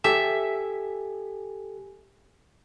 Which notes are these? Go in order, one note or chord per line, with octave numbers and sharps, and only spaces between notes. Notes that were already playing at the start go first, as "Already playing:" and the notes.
G4 A4 E5 G#5